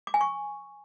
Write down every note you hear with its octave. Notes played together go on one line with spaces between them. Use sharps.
D6
G#5
C#6